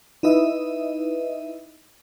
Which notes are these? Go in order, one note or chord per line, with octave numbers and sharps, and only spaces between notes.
D#4 E4 B4 D#5 E5